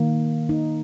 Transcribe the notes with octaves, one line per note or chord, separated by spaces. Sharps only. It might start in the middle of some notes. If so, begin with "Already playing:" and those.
Already playing: D#3 A#3
D#4